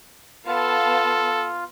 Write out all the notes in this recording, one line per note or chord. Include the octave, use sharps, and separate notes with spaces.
B3 F4 A4 F5 A5